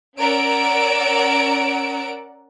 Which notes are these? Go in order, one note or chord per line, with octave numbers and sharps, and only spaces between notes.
C#4 A#4 D5 F#5 E6 D7